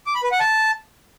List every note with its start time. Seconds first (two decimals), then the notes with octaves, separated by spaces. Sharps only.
0.06 D6
0.15 B5
0.23 B4
0.31 F#5
0.40 A5